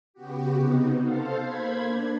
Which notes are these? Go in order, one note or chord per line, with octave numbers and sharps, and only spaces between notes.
C#3 B3 F#4 G4
C3 B3 D#4
A4 C5 F5
A#3 C5 B5 G#6
D4